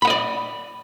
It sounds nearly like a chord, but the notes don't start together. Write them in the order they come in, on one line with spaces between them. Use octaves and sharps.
B5 F#5 D#5 D5